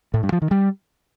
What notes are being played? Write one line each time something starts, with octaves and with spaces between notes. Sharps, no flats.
A2
G2
F3
D#3
G3